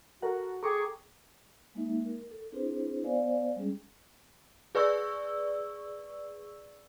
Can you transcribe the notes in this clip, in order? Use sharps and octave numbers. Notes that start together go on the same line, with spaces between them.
F#4 A4 A#4 F#5
G#4 A4 G5 A#5 C#6 D6
G#3 A#3 D#4 E5
A#4
A4
C4 D4 E4 G#4 B4 C5
B3 C5 D5 F5 G#5
G3 G#3 C#4 G#4
G#4 B4 D5 C#6 E6